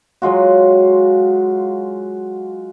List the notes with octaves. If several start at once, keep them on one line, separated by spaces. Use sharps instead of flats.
F#3 G#3 F4 F#4